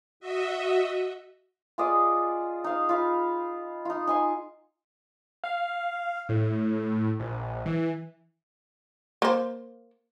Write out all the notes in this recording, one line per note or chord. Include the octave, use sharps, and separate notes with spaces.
F#4 D#5 E5
F4 G#4 D5 D#5
D#4 F5
F4 F5 B5
D#4 F4
D#4 G#5 C6
F5
A2
A#1
E3
A#3 C5